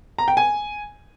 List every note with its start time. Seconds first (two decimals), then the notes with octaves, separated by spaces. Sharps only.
0.18 A#5
0.28 G5
0.37 G#5